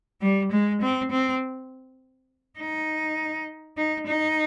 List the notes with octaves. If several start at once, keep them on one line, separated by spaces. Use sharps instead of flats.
G3
G#3
C4
C4
D#4
D#4
D#4